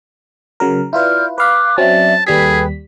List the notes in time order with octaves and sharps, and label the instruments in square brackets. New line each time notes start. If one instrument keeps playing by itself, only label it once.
[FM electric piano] C#3 F#3 A#4
[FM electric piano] E4 F4 B4 [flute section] D5 F6 G6
[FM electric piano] B4 F5 B5 [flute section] D6 F#6
[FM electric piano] F#3 C4 C#4 [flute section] D5 E5 [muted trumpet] A5
[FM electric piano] D#2 G3 B6 [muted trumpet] G#4 [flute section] A4 B4 G5